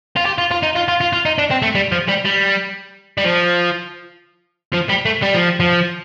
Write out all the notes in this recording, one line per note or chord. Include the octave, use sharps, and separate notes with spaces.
F4
G4
F4
F4
D#4
F4
F4
F4
F4
D#4
D4
C4
A3
G3
F3
G3
G3
G3
F3
F3
G3
A3
G3
F3
F3